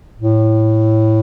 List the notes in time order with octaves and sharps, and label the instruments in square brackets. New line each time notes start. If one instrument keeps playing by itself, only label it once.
[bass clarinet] A2